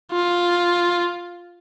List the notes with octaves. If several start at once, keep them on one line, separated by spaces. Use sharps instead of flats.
F4